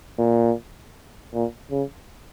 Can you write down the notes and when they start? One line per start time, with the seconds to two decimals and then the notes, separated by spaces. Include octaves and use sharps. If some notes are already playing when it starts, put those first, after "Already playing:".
0.18 A#2
1.33 A#2
1.71 C#3